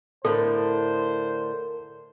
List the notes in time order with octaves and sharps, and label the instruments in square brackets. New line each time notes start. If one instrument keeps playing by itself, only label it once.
[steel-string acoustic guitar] A2 D3 [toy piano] A4 [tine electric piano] A#4 [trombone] C5